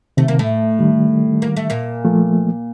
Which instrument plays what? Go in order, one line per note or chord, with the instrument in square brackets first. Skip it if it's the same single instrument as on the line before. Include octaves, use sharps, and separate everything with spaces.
[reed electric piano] C3 D#3 [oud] A3
[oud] A#3
A2 A3
[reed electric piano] D#3 G3
[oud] A#3
A3
A#2 A#3
[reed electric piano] F3 A3